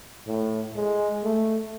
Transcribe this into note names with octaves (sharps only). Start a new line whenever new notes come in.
A2
G#3
A3